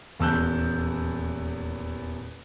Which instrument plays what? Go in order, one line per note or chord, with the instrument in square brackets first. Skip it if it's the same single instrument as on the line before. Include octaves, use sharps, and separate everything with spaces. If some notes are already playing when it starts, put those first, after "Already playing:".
[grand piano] D#1 E2 A5 E6 F#6 G6